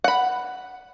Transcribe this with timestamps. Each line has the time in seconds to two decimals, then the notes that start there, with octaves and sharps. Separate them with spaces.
0.04 F#5 B5